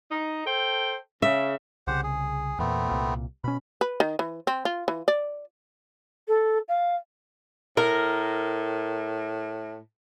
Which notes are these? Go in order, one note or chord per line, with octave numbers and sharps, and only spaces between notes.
D#4
A4 C5 G5
C#3 E5
C2 C#3 G4 C5 F#5
G#4
E2 A#2 A3 B3 C4
C2 A#2
B2 C#4 B5
B4
D#3
E3
C4
F4
E3
D5
A4
F5
A2 A#4